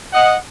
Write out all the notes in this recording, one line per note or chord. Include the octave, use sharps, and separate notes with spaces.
D#5 F#5